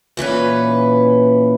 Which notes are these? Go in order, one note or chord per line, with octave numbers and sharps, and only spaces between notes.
A#2 E3 C#4 B4